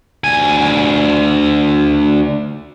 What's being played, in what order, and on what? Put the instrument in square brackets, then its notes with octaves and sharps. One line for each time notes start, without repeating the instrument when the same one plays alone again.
[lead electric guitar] D2 G#5